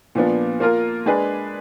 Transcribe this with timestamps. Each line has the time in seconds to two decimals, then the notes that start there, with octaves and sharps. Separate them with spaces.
0.15 A#2 F3 B3 D4
0.60 A#3 F4 A#4
1.06 G#3 D4 G#4 B4